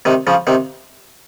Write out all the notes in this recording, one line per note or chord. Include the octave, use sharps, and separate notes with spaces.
C3 D#3
C#3 F3
C3 D#3